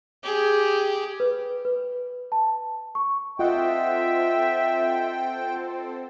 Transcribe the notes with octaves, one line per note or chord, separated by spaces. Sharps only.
G4 G#4
B4
B4
A5
C#6
C4 F4 A4 C5 D#5 E5 F#5 G5